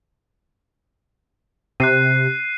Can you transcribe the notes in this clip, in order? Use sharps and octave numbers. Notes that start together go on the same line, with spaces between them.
C3 F#6 C7 D#7